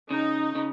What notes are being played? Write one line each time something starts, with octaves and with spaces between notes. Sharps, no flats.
C#3 D#4
C#3